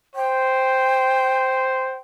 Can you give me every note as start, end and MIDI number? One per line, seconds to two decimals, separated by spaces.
0.16 1.99 72
0.16 1.97 79